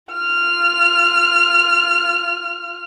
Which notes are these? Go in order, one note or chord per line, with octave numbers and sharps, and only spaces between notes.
F4 F6